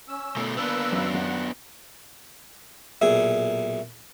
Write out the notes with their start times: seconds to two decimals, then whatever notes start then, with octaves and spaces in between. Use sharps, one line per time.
0.08 C#4 E6
0.36 B2 A3
0.57 A#3 B3 D4 B4 E6
0.92 F#2
1.14 F#2 F#5
3.01 B1 A#2 G#4 E5